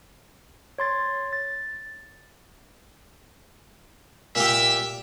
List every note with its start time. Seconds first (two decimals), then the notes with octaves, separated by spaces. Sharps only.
0.78 C#5 C6 A6
1.33 A6
4.36 A#2 G4 E5